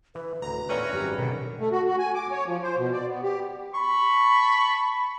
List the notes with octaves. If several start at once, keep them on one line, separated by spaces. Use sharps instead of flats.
E3 B4
A1 D2 A#5
E2 A#2 A3 C4 C#4 B4 D5
G#1 F#2 G3 G4
B2 D3 A#4
A3
F#4
F#4
G#5
D6
C#5
F3
C5
B2
D5
B3
G4
A5 B5 C#6